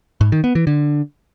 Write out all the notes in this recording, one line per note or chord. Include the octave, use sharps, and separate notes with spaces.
G#2
D#3
B3
E3
D3